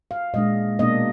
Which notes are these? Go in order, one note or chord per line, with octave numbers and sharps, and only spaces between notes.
F5
A#2 G#3 D4 D#5
B2 A#3 D4 D#5